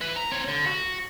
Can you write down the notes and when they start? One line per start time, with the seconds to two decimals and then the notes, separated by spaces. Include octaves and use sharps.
0.01 B4 E5
0.16 A#5
0.32 C4 C#5
0.48 D3
0.67 F#4